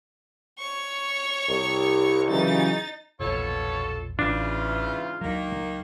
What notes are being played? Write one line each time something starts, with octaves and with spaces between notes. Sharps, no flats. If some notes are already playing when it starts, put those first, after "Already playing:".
C#5 C#6
C2
C#3 E3 F#3 D#4 A6
E1 A#1 B2 F4 A4 C#5
A1 G#2 C#3 E3 D4 F4
C#2 D#3 F#3 A#3